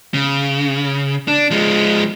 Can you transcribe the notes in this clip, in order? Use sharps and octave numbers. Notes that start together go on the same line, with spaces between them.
C#3
D4
F3 G#3